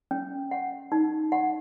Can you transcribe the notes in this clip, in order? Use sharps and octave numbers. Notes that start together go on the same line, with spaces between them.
C#4
F#5
D#4
F#5